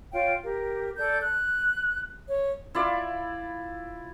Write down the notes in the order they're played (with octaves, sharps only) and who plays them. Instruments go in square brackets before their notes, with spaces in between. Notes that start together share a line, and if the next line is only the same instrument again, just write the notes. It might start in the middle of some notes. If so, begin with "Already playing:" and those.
[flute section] F4 C#5 F5 G5
G4 A#4
A4 D5 G6
F#6
C#5
[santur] E4 F4 D5